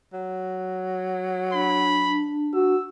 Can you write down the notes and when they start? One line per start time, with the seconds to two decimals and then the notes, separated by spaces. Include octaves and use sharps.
0.13 F#3
1.53 D4 B5
2.54 F#4 E6